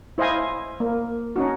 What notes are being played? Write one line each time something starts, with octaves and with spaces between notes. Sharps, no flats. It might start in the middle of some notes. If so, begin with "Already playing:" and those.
E4 C5 D#5 F5 G#5
A#3
C#4 D#4 F#4